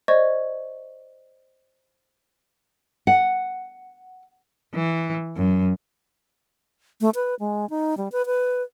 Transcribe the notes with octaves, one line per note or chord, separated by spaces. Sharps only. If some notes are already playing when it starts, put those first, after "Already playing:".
C5 D5 D#5 C#6 G#6
F#5
E3
F#2
A3
B4
G#3
D#4
G3
B4
B4